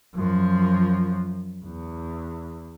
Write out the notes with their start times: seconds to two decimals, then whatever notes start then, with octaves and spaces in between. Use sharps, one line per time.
0.16 F#2 F3
1.65 E2